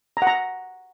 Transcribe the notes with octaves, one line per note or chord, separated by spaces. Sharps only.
A#5
F#5
A#5